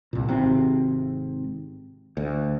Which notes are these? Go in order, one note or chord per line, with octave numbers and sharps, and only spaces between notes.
C2 A#2
G#1 C3 C4
D2